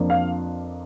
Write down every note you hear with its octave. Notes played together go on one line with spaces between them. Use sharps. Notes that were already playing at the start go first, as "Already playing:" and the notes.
Already playing: F2 F3 A#3 D4 F4
F5